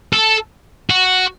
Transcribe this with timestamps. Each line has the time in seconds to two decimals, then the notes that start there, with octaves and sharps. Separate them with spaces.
0.13 A4
0.90 F#4